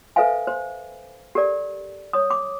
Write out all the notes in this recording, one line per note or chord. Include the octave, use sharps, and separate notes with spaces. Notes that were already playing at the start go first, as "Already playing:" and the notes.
A4 B4 C5 E5 F5 G#5
C5
G4 A4 A#4 D5
C#5 D#6
D6